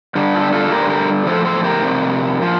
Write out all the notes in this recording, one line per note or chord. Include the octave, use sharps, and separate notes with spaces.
G2 D3 G3
F4 A4
G4
F4 A4
G2 D3 G3 G4 A#4
C5
G4 A#4
A2 F3 A4 C5
A4 C5
G4 A#4
F2 C3
F3